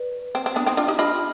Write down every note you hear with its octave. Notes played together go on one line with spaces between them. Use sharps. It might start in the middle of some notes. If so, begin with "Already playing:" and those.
Already playing: B4 D5
C4
C4
B3 D4
C4 D#4
D4 F4
D#4 G4
D4 F4 D#5 B5 F6